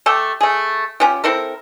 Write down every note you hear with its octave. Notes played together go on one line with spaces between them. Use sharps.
A3 G4 A4
A3 G#4
C#4 F4 G4
C4 E4 A4 A#4